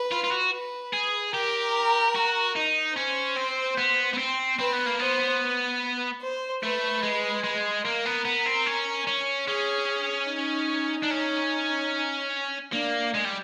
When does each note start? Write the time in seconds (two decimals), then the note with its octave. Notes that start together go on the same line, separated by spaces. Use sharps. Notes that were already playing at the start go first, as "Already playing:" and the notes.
Already playing: B4
0.11 F4
0.24 F4
0.31 F#4
0.52 B4
0.93 G#4
1.34 G4 A#4
2.16 F#4
2.56 D#4
2.96 C#4 C5
3.36 C4
3.78 B3
4.14 B3
4.18 C4
4.59 C4 B4
4.73 B3
4.86 A#3
5.00 B3 C5
5.41 B4
6.22 C5
6.63 A3 B4
7.03 G#3
7.44 G#3
7.85 A#3 A#4
8.06 B3
8.25 B3
8.46 C4
8.66 C#4
9.07 C#4
9.48 C#4 G#4
10.29 D#4
11.03 D4
11.11 C#4
12.72 A#3 D4
13.14 G#3
13.25 G3